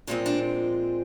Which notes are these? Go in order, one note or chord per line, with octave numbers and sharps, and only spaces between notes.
A#2 F3 G#3 C4 D4
D4